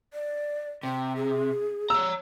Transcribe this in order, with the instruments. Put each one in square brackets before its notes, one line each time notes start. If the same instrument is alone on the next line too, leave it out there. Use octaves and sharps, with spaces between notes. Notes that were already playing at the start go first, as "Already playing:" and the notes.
[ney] D5
[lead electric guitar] C3 [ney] G5
[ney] G#4
[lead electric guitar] C#5 A#5 [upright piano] E6